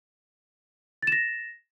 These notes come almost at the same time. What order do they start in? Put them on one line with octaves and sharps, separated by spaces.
A6 E7 A#6